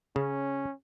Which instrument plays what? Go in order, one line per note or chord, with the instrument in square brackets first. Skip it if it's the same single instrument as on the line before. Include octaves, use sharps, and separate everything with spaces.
[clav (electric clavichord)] C#3 [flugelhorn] C#4